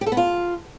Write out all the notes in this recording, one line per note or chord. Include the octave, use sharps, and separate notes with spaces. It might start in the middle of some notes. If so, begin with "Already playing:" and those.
G4
A4
B3
F4